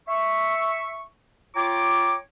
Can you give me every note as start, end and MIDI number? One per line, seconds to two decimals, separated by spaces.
0.08 1.03 76
0.08 1.03 85
1.56 2.15 65
1.56 2.15 73
1.56 2.15 79
1.56 2.15 82
1.56 2.15 86